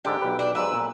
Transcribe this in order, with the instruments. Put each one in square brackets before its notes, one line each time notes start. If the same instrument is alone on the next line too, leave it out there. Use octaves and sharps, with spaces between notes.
[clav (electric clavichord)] G#2 D3 D4 [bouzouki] G4 [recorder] G5
[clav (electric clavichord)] B1 B4
[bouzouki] D4 [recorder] G5
[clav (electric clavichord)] B1 G#2 [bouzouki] B4 [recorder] E6
[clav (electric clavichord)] A#2